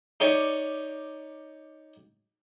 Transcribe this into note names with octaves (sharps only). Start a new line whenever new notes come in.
D#4 G4 C#5 D5